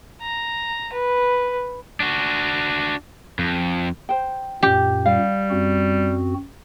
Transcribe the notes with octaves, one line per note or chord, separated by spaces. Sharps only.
A#5
B4
D4 F#4
F2
C5 G5
F#2 A#2 G4
G3 F5
F#2 C4 F#4